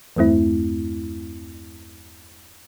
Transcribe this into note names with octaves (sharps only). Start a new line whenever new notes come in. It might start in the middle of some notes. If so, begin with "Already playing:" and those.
E2 G2 A3 C4 E4